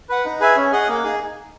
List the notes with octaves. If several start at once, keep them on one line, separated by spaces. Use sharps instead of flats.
B4 F#5
D#4
G#4 B4 E5 G#5
C#4
G#4 D#5 F#5
A#3
D#4 G#4